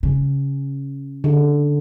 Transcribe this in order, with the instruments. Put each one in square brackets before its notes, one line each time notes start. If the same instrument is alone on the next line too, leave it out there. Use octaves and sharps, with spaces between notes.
[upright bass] C#3
[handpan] D3